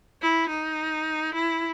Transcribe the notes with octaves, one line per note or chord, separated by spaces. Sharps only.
E4
D#4
E4